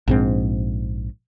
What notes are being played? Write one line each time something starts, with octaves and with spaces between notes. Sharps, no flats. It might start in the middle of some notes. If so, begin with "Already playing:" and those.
A#1 G#2 C4